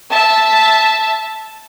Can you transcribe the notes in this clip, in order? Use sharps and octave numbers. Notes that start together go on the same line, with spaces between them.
E5 A5